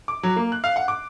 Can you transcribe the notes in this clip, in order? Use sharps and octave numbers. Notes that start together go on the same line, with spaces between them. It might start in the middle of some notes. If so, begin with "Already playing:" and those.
D6
F#3
A#3
F#6
F5
F#5
D6